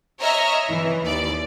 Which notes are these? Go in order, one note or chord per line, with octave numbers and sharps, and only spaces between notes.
C#5 D#5 E5 A#5 F6
E3
D#2 D5